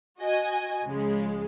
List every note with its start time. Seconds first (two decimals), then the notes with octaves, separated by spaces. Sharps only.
0.19 F#4 D#5 G#5
0.86 C#2 C#3 F3 G#3